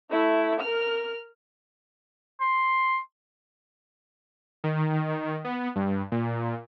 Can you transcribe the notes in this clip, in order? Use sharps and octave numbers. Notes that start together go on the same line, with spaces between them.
A3 E4
A#4 F6
C6
D#3
B3
G2
A#2